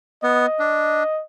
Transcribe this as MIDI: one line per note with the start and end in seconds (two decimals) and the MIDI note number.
0.24 0.46 59
0.24 1.22 75
0.59 1.03 62